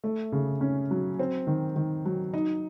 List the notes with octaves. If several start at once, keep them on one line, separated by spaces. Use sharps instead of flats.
A3
C#3
C#4
F#3
C4
D#3
D#3
F#3
D#4